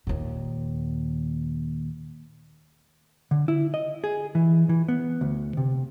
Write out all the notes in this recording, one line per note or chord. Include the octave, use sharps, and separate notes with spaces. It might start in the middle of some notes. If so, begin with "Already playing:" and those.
D#2 A#2
D3
E4
D#5
G#4
E3
E3
B3
D2
C3